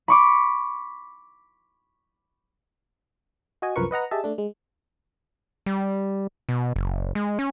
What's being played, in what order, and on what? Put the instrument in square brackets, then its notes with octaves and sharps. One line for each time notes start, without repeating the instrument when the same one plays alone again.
[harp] B5 C#6 D6
[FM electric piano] F#4 D#5 G#5
C2 F#2 F3 A#4 B4 C#6
B4 D#5 F#5 A#5
G4 G#4 D#5 E5 A5
A3 D4
G#3
[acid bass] G3
B2
F#1
G#3
C#4